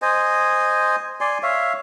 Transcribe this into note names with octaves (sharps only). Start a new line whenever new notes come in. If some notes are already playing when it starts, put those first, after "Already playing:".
C5 D#5 G#5
D5 G#5 C6
C#5 E5 F5